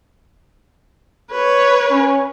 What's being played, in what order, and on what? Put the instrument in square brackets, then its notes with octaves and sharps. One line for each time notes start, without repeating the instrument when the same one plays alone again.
[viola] B4 C#5
[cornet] C#4